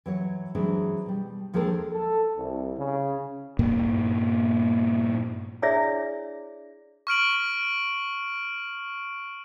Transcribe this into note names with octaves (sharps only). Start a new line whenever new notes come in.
E3 F#3 C#5
E3 F#3 G#3 C4 D4
B2 G3
D#2 F3 G#3 D4 A4 A#4
A4
C2
C#3
G2 A#2 A#3
D4 E4 G#4 C#5 D5 E5
C#6 F6 D7 F#7